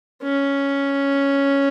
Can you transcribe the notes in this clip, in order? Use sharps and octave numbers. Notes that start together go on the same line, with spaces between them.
C#4